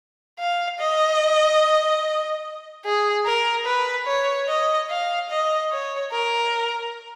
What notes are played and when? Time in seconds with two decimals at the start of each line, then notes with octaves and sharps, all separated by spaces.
0.39 F5
0.80 D#5
2.85 G#4
3.26 A#4
3.66 B4
4.07 C#5
4.48 D#5
4.90 F5
5.30 D#5
5.71 C#5
6.12 A#4